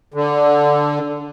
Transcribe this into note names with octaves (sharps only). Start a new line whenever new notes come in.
D3